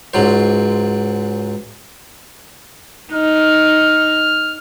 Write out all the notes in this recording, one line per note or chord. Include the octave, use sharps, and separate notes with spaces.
C#2 G#2 F#3 C5
D#4 F6